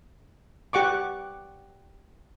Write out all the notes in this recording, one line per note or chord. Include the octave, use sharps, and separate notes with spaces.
G4 F#5 C#6 D6